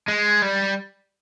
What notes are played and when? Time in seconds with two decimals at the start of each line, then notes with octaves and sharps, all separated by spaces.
0.08 G#3
0.42 G3